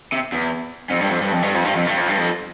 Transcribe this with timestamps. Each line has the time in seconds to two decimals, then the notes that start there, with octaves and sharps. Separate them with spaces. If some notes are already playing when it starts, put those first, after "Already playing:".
0.12 C3
0.32 E2
0.90 F2
1.01 G2
1.11 F2
1.22 G2
1.32 F2
1.43 G2
1.54 F2
1.64 G2
1.76 F2
1.87 G2
1.97 F2
2.08 G2
2.18 F2